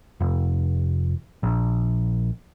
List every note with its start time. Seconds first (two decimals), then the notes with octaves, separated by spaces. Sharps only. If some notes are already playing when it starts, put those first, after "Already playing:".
0.21 F1
1.43 A#1